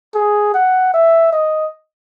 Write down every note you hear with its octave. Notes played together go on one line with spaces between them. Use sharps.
G#4
F#5
E5
D#5